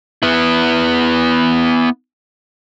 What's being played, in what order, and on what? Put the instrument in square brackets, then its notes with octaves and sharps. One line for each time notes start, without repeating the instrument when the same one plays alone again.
[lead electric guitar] B3 E4